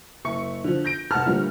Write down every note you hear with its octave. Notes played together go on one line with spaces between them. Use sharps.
F#1 E5 C#6 C#7
D3 F3
G6 A#6 D7
F1 F#5 A5 F6
A#2 D3 F3 G3 A3